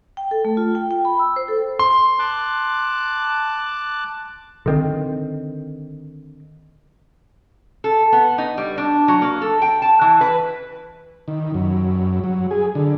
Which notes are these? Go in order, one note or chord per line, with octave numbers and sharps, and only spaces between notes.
G5
A4
A3
F4
G5
G5
B5
E6
C5
A4
C6
A5 D6 F#6
D3 D#3 C4
A4
B3
D#4
G3
D4
F#3
A#3
A4
G5
A5
E3
B4
D#3
F#2
F#3
G#4
D3